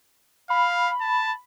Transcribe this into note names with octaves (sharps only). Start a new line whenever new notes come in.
F5 B5
A5